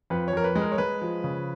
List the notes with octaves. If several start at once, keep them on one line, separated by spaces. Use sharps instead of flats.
F2 B4
C#5
F2 A#4
B4
G#3
A#4
C#5
G#3 B4
F3
C#3